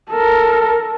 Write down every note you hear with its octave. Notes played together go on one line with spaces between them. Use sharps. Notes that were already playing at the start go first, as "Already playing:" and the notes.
A4 A#4